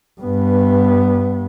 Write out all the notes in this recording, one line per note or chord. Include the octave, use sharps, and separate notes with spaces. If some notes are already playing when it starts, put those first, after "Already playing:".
G2 B3